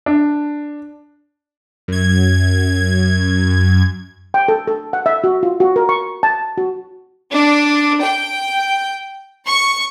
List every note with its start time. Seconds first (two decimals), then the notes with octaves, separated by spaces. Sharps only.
0.06 D4
1.88 F#2 G#6
4.34 G5
4.48 A4
4.68 A4
4.93 F#5
5.06 E5
5.24 F#4
5.43 F4
5.60 F#4
5.76 A#4
5.89 C#6
6.23 A5
6.58 F#4
7.33 D4
8.02 G5
9.47 C#6